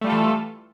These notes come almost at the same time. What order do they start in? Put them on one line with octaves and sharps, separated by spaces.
A3 G3 F4 A4 E3